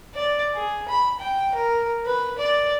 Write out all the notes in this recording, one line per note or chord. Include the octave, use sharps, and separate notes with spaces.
D5
G#4
B5
G5
A#4
B4
D5